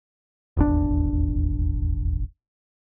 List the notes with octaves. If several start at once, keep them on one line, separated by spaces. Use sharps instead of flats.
D#1 G#1 E2 D4